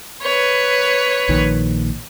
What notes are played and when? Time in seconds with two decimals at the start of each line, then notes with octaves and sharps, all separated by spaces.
0.22 B4 C#5
1.29 A#1 A#2 D#3